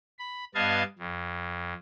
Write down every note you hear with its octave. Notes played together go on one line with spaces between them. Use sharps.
B5
G2 B3 D#5 F5 A5 G#6
F2